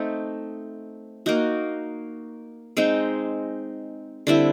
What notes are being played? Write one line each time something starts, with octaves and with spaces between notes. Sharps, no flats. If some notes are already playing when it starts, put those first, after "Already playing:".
Already playing: A3 C4 D#4
A#3 D#4 F#4
G#3 C4 D#4
D3 G3 C4 E4